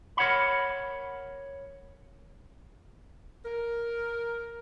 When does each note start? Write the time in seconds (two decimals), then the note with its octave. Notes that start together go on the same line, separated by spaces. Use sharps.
0.17 A#4 C#5 F#5 B5
3.45 A#4